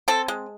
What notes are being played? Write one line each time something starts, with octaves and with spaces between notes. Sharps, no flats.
C4 A4
G#3